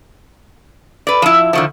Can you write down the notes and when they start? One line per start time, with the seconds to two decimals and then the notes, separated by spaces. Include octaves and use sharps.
1.07 B4 D5
1.22 F3 E4
1.53 D3 D#3 F3